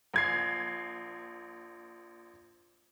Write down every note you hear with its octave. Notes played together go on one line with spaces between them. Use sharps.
A#1 G#6 C7